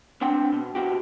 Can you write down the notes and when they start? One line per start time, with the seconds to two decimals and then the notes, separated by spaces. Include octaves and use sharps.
0.21 B3 C4 D4 G5
0.52 B2
0.75 B2 F#4 G4